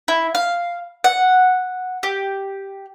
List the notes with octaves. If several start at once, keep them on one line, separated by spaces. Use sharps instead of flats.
E4
F5
F#5
G4